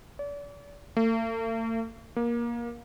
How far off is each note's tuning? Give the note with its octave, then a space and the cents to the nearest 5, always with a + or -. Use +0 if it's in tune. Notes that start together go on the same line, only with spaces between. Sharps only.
D5 -40
A3 +45
A#3 +20